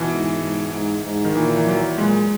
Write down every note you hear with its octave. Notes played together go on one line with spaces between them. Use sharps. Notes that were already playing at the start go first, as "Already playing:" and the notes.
Already playing: B2 E3
G#2
G#2
G#2
G#2
D#3
A#2 E3
E3
F#3
A#2 G#3